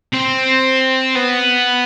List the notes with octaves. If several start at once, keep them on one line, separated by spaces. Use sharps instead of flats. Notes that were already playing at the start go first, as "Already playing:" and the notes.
C4
B3